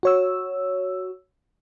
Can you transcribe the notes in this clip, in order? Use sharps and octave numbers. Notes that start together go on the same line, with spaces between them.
F#4 C#5 E6